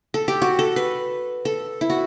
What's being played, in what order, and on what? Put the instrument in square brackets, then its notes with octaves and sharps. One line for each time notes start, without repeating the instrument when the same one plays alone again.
[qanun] A4
G4
F#4
A4
B4
A4
E4
F#4